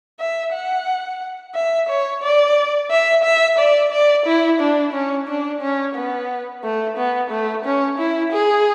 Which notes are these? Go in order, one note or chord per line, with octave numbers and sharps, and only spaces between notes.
E5
F#5
E5
C#5
D5
E5
E5
D5
D5
E4
D4
C#4
D4
C#4
B3
A3
B3
A3
C#4
E4
G#4